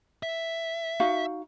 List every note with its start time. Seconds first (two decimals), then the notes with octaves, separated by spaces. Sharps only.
0.23 E5
1.00 D#4 F#4 F5